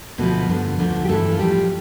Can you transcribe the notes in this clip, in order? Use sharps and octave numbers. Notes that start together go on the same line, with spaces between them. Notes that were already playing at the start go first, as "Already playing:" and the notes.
D2 B2 D3 F3 B3
G2 D3 F3
D2 D3 F3
G4
G2 E3 A3 A4
F4
A2 F3 G3 G4